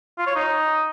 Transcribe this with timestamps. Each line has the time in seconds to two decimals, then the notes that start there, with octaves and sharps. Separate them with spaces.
0.18 F4
0.27 C#5
0.35 D#4